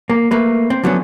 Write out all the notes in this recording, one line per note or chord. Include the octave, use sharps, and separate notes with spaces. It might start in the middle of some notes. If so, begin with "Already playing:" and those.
A#3
A3 A#3 B4
C4
D3 F3 F#3 A3 B3 C#4